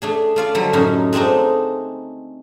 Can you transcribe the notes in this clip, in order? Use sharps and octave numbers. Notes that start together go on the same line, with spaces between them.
A3 D4 G#4
A3 F4 D5
D3 F#3 G3 A3
F#2 A2 C#4 D#4
G#3 A3 C4 D4 D#4